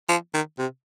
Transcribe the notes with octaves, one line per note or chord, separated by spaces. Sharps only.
F3
D#3
C3